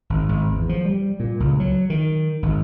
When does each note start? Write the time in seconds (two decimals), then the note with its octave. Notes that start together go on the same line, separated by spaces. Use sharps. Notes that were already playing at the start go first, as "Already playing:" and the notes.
0.10 G#1
0.29 G#1
0.52 E2
0.69 F3
0.85 G3
1.20 A#2
1.40 C#2
1.60 F#3
1.90 D#3
2.43 G#1